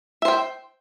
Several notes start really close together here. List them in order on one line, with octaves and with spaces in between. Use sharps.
E5 C5 G5